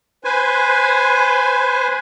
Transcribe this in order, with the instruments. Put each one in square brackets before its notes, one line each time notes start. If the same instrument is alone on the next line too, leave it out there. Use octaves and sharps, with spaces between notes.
[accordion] B4 C5 G#5